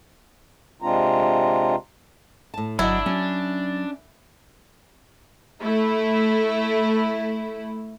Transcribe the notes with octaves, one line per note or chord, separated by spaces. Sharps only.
C3 G#3 C4 D4 F4 A#5
A2 A5
G1 F#3 D4 E4 D#5
F#3 C#4
A3 E4